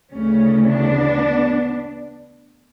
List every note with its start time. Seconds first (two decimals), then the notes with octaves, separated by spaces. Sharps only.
0.13 D2 C#3 E3 A3 C#4
0.68 B3 D4